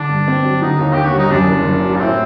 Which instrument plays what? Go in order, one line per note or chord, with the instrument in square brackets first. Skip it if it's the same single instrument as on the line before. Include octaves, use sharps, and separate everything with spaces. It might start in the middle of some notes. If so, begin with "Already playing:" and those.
Already playing: [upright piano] D3 [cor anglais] D4
[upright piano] G2
C4
F#3
[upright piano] D3 [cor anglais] D#4
[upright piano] D#2
[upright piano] D#2 [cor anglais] G4
[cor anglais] F#4
[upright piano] G3 [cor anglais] D#4
[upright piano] F#2 [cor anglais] D4
[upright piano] F#1
F#1
F#3
[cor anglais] A#3
[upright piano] A2 [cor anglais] C4